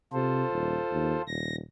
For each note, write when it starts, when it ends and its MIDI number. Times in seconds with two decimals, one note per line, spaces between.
0.13 0.44 48
0.13 1.22 65
0.13 1.22 69
0.13 1.22 72
0.52 0.77 27
0.92 1.15 39
1.27 1.61 27
1.27 1.56 94